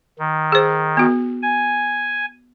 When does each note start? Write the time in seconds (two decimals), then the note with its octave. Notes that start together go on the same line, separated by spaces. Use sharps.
0.19 D#3
0.52 G#4 C5
0.97 B3 F#4
1.42 G#5